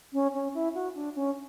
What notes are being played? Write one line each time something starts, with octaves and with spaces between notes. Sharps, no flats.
C#4
C#4
E4
F#4
D4
C#4